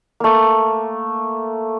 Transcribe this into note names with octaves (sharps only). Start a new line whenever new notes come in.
A3 A#3